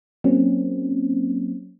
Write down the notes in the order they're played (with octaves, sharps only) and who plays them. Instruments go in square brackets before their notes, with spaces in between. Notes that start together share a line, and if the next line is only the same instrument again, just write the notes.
[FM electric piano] F#3 A#3 C4 C#4